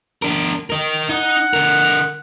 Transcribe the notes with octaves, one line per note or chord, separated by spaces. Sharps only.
D4 A#4
A#4 D#5
D#4 F#5
D3 A#4